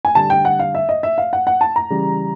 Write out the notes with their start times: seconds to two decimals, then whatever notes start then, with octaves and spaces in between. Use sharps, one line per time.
0.05 G#5
0.15 D3 G3 A5
0.30 G5
0.45 F#5
0.59 F5
0.75 E5
0.89 D#5
1.03 E5
1.18 F5
1.33 F#5
1.47 F#5
1.61 A5
1.76 A#5
1.90 C#3 E3 G3